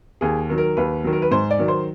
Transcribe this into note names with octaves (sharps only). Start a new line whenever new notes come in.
D#2 G#4
D#3 F#3
A#4
D#2 B4
D#3 F#3
A#4
B4
G#2 C5
D5
D#3 F#3
C5